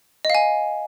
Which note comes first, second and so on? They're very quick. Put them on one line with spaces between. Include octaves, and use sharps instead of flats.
D#5 F5 G#5